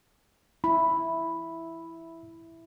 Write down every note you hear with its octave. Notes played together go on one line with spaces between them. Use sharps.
E4 B5